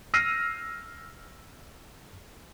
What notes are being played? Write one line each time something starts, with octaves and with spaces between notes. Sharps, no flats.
E6 F6 A#6 C7 D#7